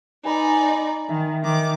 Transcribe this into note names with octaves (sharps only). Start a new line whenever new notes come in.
D#4 B4 D5 G#5
A#5
D#3 E5
D#3 D6